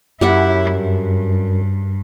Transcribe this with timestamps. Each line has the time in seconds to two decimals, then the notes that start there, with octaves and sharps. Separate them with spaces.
0.21 F#2 E4 G4 E5 F#5
0.72 G2